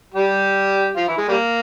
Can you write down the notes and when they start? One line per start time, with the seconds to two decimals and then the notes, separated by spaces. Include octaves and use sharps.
0.14 G3 G4
0.97 F3 F4
1.08 E3 E4
1.18 G#3
1.28 G3 A#3